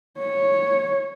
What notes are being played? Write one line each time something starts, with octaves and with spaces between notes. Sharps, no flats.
C#5